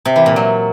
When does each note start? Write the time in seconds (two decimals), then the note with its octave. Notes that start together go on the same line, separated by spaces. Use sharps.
0.05 C3
0.16 E3
0.26 A#2
0.36 F#3